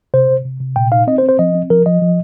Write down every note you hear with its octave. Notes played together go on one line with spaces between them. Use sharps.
C3 C5
C3
C3
C3
A#2 G5
D#4 F5
C4 D#5
C5
C4
C5
F3 D#5
C4
F3 A#4
F3 D#5
F3